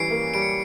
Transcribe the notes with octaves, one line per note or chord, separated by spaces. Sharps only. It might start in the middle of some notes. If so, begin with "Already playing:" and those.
Already playing: E3 G3 C#4 C7 D7
A#3
G3 D7
C#7